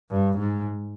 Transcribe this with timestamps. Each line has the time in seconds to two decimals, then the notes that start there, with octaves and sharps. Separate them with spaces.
0.11 G2
0.39 G#2